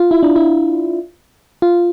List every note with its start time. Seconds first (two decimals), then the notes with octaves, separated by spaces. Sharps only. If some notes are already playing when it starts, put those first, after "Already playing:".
Already playing: F4
0.11 E4
0.23 D4
0.36 E4
1.62 F4